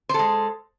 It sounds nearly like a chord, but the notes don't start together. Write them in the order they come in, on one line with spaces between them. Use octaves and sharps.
C5 A4 G#3